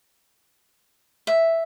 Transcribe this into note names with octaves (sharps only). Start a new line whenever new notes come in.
E5